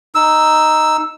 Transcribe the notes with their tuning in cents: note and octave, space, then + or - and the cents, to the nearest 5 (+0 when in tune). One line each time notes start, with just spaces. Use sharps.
D#4 +0 E6 +0